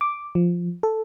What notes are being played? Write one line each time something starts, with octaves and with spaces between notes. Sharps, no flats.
D6
F3
A4